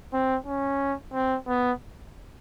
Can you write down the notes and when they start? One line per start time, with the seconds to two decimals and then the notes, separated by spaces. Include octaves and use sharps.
0.13 C4
0.47 C#4
1.14 C4
1.48 B3